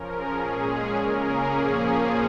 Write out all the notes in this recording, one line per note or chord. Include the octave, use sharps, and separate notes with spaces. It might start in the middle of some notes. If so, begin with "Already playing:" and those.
Already playing: F3 C#4 A#4
G#4
A#2 G#3 C#4
C#3 A#3 C#4 A#4
G#4
A#2 F3 A#3 C#4